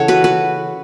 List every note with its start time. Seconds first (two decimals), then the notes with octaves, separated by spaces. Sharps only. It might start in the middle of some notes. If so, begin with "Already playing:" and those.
Already playing: C#3 E3 A4 C#5 F#5
0.08 F#4 B4
0.24 F#4 B4